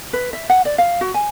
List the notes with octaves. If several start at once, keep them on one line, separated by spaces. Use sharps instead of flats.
B4
E5
F#5
D5
F5
F#4
G#5